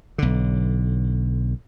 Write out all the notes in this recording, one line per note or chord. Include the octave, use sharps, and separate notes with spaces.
B1 D3